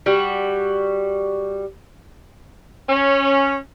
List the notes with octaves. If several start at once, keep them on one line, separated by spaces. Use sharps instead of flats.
G3 F#4
C#4